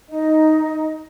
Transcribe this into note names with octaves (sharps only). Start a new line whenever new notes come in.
D#4 D#5